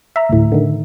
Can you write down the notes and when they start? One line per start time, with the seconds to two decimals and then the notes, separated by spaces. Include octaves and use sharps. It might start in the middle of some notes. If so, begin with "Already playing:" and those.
0.16 E5 A#5
0.29 D2 A2
0.52 D3 D#3